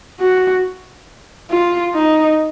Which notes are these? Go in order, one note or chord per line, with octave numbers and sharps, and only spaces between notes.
F#4
F4
D#4